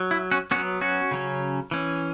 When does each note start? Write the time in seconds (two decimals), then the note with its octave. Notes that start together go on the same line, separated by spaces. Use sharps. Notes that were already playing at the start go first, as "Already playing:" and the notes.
Already playing: F#3
0.11 E4
0.31 C#4 F#4
0.51 F#3 B3 C#4 F#4
0.81 C#4 F#4
1.11 C#3 F#3 C#4
1.71 E3 C#4